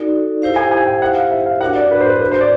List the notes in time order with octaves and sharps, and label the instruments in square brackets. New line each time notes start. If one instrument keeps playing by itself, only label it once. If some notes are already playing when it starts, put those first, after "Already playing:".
Already playing: [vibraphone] D#4 F#4 A4 D5
E4 G4 C5 F5
[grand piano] G#5
G#5
G5
F#5
F5
E5
F5
[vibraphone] D4 F#4 A#4 C#5 [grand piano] F#5
[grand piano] D5
B4
C5
B4
B4
C5
D5